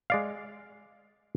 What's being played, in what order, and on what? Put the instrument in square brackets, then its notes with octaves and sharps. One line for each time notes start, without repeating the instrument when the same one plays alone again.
[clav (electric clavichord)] G#3 D5 F5